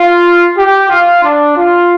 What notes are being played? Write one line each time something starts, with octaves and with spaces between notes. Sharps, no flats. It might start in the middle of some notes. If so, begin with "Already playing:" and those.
Already playing: F4
G4
F4
D4
F4